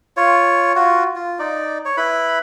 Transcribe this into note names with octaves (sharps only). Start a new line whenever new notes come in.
F4 C#5
F4 F#4
F4
D#4 D5
C#5
E4 B4 B5